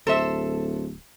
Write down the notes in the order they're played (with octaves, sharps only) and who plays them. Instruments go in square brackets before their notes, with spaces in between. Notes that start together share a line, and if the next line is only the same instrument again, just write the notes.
[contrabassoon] D1 [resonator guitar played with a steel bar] A4 C5 E5